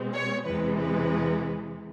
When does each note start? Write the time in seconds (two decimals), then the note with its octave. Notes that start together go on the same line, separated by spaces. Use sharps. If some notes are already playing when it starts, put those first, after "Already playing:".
Already playing: B2 G#3 C4
0.12 C#5
0.45 E2 C3 E3 G#3 B4
0.79 B4